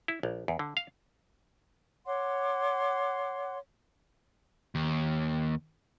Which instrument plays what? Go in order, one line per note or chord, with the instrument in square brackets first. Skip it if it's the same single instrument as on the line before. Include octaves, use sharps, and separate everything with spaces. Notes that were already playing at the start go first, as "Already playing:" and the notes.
[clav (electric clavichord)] E4
A#1
E2
D3
F5
[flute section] C#5 F#5 C6 D6
[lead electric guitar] D#2